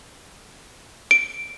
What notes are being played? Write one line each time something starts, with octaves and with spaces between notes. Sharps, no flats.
D7